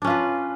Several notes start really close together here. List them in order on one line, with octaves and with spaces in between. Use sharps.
D4 C#4 F4 B4